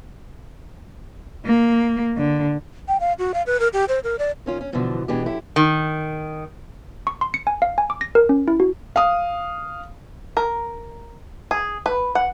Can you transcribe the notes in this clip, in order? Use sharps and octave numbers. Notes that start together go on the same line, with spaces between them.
A#3
D3
G5
F5
F#4
F5
B4
A#4
G4
C5
A#4
D5
D#3 C#4 F4
C#4
G2 B2 D3 E3 F3
B2 E3 G#3 D4 G4
F#2 E4 G4 A4
D#3
C#6
C6
C#7
G#5
F5
G#5
D6
A#6
A#4
C#4
E4
F#4
F5 D#6
A#4
G#4
B4
F#5